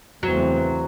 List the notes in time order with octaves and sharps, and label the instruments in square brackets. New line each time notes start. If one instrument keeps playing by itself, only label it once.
[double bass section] E2 C#3 E3 A3 C4 [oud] F#3